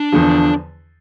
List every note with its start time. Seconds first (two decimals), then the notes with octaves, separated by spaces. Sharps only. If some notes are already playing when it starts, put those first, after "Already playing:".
Already playing: D4
0.12 E2 D3 F3